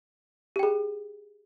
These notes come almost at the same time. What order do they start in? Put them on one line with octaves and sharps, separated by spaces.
G4 G5 G#4